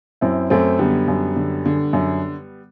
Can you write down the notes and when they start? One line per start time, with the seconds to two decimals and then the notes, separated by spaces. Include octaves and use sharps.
0.21 F#2 C4 E4
0.50 F#2 A3 C4
0.79 D3 G3 B3
1.08 F#2
1.36 D3
1.66 D3
1.93 F#2